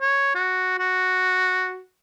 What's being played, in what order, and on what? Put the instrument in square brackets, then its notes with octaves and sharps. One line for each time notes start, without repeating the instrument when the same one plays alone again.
[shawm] C#5
F#4
F#4